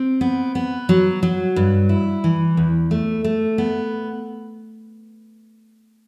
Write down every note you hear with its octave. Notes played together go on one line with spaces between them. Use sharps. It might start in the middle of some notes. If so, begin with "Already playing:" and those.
Already playing: C4
B3
B3
F#3
F#3
G2
E4
E3
E2
A3
A3
B3